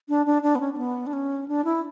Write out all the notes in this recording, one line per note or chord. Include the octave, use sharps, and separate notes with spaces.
D4
D4
D4
B3
C#4
C#4
B3
D4
C#4
D4
E4